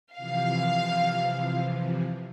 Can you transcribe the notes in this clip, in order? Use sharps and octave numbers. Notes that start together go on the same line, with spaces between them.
C3 E3 F3 F5